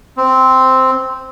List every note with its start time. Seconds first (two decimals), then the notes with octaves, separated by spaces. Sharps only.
0.17 C4